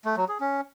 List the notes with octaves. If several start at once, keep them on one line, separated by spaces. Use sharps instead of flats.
A3
F#3
G#4
C#4